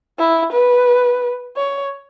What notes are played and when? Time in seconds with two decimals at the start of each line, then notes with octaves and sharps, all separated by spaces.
0.19 E4
0.53 B4
1.57 C#5